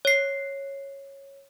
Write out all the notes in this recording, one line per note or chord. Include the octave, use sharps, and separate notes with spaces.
C#5 C7